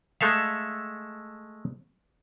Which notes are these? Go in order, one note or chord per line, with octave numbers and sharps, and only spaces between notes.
G#3 A3 A4 E5 F5